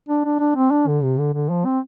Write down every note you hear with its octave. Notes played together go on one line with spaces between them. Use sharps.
D4
D4
D4
C4
D4
D3
C3
D3
D3
F3
C4